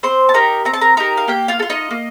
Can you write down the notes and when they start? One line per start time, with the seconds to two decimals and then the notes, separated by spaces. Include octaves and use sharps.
0.03 C4 C5 C6
0.29 A5
0.34 D#4 G4 A#4 A#5
0.65 C4 A#5
0.73 A5
0.81 A#4 A#5
0.97 D#4 G4 A#4 A#5
1.17 F5
1.27 A#3 G4 G5
1.48 F4 F5
1.59 A4
1.62 F4
1.70 D#4 D#5
1.91 A#3